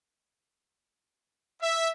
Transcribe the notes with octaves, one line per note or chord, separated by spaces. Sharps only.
E5